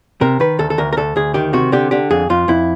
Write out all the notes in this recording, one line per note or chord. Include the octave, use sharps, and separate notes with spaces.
C3 A#4
D#3 B4
D2 A4
A4
D2 A#4
A#4
D2 A4
D2 G#4
D#3 G4
C3 F#4
D3 G4
D3 G4
F2 G#4
F2 F4
F2 E4